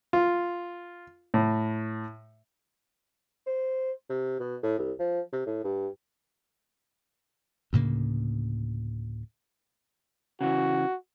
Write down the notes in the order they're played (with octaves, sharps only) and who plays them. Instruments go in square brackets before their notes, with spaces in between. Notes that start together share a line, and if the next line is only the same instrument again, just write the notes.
[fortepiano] F4
A2
[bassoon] C5
C3
B2
A2
C2
F3
C3
A2
G2
[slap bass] D2 A2 C#3 A#3
[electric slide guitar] C#3 E3 [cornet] F#4